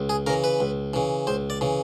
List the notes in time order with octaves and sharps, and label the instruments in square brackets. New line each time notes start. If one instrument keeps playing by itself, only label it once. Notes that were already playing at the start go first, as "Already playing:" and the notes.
Already playing: [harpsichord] C#2
G#4
C#3 E3 A#4
B4
C#2
C#3 E3
C#2 C5
D5
C#3 E3